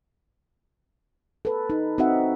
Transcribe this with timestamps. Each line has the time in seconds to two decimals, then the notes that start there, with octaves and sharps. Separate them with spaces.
1.45 A4 B4
1.70 D#4
1.98 C4 D#4 F#4 D#5 E5 F#5